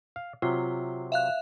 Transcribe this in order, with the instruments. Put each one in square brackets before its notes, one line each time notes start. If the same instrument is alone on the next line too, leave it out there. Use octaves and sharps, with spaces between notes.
[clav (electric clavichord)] F5
[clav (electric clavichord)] C3 F#3 [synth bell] F4
[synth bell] E5 F5 F#6